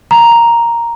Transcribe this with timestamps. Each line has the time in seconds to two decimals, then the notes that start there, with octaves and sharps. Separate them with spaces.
0.11 A#5